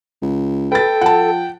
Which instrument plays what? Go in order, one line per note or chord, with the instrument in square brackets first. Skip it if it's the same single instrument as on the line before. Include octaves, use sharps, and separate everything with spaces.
[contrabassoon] C#2
[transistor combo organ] A4 [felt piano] B4 A6 [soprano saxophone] G5
[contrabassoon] F3 [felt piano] F#5 A5